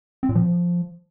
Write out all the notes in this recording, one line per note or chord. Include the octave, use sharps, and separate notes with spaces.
C4
A#2
F3